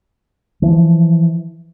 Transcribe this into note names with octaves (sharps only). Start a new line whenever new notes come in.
E3 F3